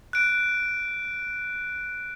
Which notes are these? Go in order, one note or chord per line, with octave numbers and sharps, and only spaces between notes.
F#6 D7